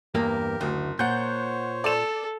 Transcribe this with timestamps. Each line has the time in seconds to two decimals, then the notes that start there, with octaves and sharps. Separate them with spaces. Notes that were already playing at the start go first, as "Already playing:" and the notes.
0.15 E2 G2 A#3 G4 A#4
0.61 F#1 D2
0.99 A#2 C5 C#5 F#5 G6
1.84 A4 D5 E7